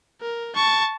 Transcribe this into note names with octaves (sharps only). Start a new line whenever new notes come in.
A#4
A5 C#6